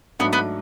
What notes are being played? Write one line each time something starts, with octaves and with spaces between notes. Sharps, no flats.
G#2 F#3 A3 B3 D4
B3